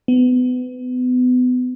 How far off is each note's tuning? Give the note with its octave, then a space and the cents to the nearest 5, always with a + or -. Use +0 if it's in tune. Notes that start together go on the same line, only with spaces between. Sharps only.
B3 +25